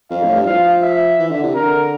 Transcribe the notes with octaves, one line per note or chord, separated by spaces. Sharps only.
F2 F5
A2
G2
F3 F5
E5
E3
D3
C3
D3 A#4